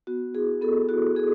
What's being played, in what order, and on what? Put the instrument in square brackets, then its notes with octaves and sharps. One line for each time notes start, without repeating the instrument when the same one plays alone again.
[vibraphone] B3 F#4
E4 G#4
B3 A4
E4 F#4
B3 G#4